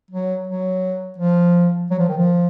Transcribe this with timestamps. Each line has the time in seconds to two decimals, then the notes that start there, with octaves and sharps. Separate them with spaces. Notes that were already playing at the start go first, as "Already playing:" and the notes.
0.11 F#3
0.47 F#3
1.18 F3
1.90 F#3
1.99 F3
2.09 D#3
2.17 F3